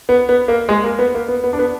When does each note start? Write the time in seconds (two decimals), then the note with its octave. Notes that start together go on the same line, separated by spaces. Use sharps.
0.09 B3
0.29 B3
0.48 A#3
0.69 G#3
0.84 A#3
0.99 B3
1.14 A#3
1.28 B3
1.44 B3
1.53 D4
1.59 B3